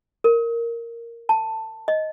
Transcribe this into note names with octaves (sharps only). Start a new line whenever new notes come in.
A#4
A5
D#5